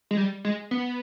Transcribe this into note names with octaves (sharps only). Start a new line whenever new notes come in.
G#3
G3
G#3
B3